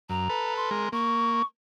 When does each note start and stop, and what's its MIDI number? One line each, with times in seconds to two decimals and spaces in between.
0.10 0.28 42
0.10 0.54 82
0.29 0.70 69
0.29 0.70 71
0.57 0.90 84
0.71 0.89 56
0.71 0.89 70
0.92 1.42 58
0.92 1.44 85